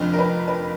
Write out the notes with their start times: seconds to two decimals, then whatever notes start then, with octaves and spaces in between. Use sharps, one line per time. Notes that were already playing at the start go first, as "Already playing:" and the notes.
Already playing: F1 F2 D3
0.13 A#4
0.19 B4
0.48 B4